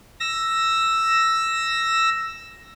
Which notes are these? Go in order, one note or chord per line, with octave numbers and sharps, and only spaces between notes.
E6 A#6